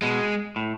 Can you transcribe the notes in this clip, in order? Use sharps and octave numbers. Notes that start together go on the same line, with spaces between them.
B2 G#3
A2